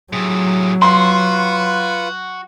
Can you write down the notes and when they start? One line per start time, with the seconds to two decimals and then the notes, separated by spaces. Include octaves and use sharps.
0.13 A2 C3 F#3 G#4
0.82 F4 F#4 B4 C6